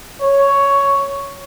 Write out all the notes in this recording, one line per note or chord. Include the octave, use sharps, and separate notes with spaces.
C#5